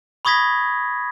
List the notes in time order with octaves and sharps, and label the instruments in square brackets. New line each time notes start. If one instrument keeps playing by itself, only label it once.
[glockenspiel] B5 C#6 D#6 G#6 A#6 B6